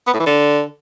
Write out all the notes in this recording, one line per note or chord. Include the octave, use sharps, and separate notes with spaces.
B3
A2
E3
D3